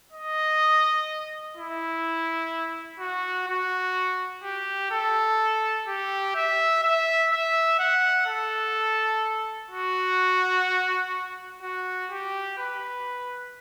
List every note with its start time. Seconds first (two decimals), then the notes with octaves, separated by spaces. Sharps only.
0.12 D#5
1.57 E4
3.00 F#4
3.48 F#4
4.44 G4
4.91 A4
5.88 G4
6.35 E5
6.83 E5
7.32 E5
7.79 F#5
8.27 A4
9.71 F#4
11.62 F#4
12.11 G4
12.58 B4